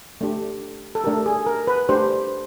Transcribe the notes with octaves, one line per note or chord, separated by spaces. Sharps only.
A3 D4 G4
A4
A3 D4 G4 A#4
G#4
A#4
B4
A3 D4 G4 C5